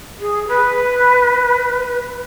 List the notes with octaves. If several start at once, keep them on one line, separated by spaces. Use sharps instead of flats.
G#4
B4